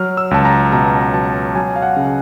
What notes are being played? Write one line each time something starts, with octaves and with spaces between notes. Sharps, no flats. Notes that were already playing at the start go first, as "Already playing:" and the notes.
Already playing: F#3 F6
E6
C#2 A5
A#5
B2 A#5
A#5
F#3 A5
F#3 G#5
F5
F#5
C#3